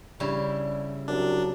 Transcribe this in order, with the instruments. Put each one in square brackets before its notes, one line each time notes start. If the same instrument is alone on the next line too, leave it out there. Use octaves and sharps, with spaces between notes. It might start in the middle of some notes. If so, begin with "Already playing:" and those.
[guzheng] C#3 G3 E4 [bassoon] D4
[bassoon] C2 [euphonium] F#3 [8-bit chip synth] D4